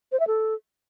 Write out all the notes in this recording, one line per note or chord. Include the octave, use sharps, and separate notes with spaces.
C5
E5
A4